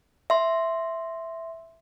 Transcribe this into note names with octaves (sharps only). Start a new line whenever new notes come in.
E5 C6